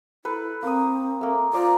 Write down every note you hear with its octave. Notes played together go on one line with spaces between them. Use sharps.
E4 A4 B4
A#3 C4 D#6
A3 A#3
F4 C5 D5 A#5